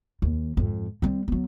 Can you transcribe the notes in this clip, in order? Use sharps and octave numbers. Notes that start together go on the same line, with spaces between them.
D#2
F2 G#2
G3 C4
F#3 B3